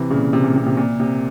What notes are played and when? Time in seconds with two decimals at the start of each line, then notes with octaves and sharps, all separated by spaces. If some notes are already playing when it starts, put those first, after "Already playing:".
Already playing: C3 E3
0.10 A#2 C#3
0.33 C3
0.44 A#2
0.56 C3
0.66 C3
0.77 A#2
1.00 C3